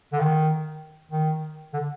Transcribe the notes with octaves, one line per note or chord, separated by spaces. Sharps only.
D3
D#3
D#3
D3